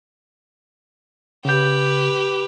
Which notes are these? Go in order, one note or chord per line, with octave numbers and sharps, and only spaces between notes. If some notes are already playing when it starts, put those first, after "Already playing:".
C#3 G4 B4 G6